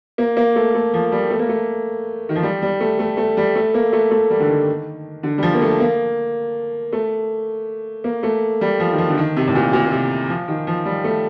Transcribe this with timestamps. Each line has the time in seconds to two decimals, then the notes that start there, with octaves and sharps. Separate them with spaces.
0.18 A#3
0.37 A#3
0.56 A3
0.74 A3
0.94 F3
1.12 G3
1.30 A3
1.39 A#3
1.49 A3
2.29 D#3
2.35 F3
2.43 G3
2.62 G3
2.80 A3
2.99 A3
3.17 A3
3.37 G3
3.55 A3
3.74 A#3
3.93 A3
4.11 A3
4.30 G3
4.40 D3
4.49 D#3
5.23 D3
5.38 G3
5.43 F3
5.54 A#3
5.62 A3
5.80 A#3
6.93 A3
8.04 A#3
8.23 A3
8.61 G3
8.80 F3
8.92 D#3
8.98 F3
9.10 D3
9.18 D#3
9.36 C3
9.47 A2
9.55 A#2
9.73 A#2
9.85 A#2
9.91 C3
10.29 F3
10.48 D#3
10.67 F3
10.85 G3
11.04 A3